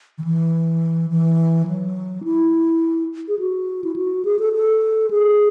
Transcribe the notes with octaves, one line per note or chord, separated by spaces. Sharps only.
D#3
E3
E3
F#3
E4
G#4
F#4
E4
F#4
G#4
A4
A4
G#4